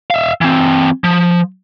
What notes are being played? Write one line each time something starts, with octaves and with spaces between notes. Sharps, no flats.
E5 F5
E3 C4
F3